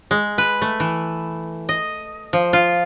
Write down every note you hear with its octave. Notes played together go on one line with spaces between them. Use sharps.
G#3
B4
A3
E3
D#5
F3
F4